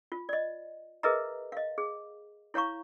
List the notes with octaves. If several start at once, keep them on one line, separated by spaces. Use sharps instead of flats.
F4
D5 D#5
G#4 A#4 B4 D#5 E5 A#5
D#5 F5
G#4
E4 C#5 F5 A#5 C#6